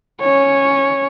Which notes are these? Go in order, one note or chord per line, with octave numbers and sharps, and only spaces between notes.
C#4 C#5